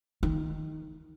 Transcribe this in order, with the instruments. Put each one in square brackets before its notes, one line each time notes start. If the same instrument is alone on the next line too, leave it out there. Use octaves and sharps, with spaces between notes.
[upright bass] D#3